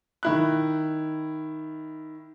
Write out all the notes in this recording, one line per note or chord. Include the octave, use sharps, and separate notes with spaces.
D#3 E4 F#6